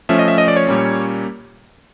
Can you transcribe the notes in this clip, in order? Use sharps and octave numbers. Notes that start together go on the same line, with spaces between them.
F3 A3 C#4 E5
D#5
E5
D#5
D5
C#5
A#2 G3 A#3 C#4